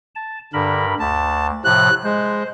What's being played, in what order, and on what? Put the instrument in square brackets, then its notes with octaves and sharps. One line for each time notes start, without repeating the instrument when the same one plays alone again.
[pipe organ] A5
[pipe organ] G2 A#4 B5 [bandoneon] D3
[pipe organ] D2 [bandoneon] A5
[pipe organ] A2 C3 F3 [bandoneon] F#6
[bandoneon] G#3 [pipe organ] C5